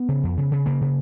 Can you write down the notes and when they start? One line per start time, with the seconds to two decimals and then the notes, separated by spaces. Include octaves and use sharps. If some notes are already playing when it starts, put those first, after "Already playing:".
Already playing: B3
0.09 C#3
0.23 F2
0.37 C#3
0.52 C#3
0.66 C#3 A#3
0.81 C#3